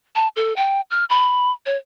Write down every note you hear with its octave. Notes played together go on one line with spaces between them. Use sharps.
A5
A4
G5
F6
B5
C#5